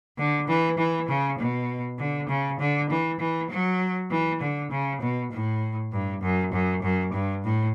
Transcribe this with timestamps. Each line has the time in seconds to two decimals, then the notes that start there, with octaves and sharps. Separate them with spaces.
0.18 D3
0.48 E3
0.78 E3
1.08 C#3
1.38 B2
1.99 D3
2.29 C#3
2.59 D3
2.90 E3
3.20 E3
3.50 F#3
4.11 E3
4.41 D3
4.71 C#3
5.01 B2
5.32 A2
5.92 G2
6.22 F#2
6.52 F#2
6.83 F#2
7.13 G2
7.43 A2